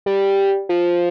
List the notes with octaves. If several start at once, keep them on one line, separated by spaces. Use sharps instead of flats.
G3
F3